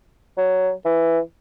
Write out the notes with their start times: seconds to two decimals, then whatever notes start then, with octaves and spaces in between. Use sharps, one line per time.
0.38 F#3
0.85 E3